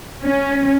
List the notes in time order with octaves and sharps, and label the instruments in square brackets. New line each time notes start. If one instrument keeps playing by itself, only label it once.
[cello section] C#4